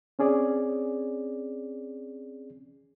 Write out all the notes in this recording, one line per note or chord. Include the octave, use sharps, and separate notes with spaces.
C4 C#4 G#4 D5